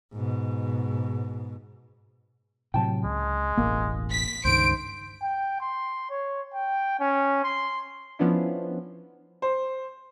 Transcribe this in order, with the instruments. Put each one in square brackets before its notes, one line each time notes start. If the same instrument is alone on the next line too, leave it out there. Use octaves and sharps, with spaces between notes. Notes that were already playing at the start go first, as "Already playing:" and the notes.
[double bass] G#2 B2
[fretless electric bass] A2 C3 F#3 [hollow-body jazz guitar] G5 A5
[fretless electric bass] C#2 [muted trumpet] G#3
[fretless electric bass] E1 A1 [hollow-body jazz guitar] A#3
[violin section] B6
[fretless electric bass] C#2 G2 D#3 [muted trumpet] C5 [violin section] D7
[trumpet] G5
C6
C#5
G5
C#4
C6
[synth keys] F3 B3 C#4 D4 E4
[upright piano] C5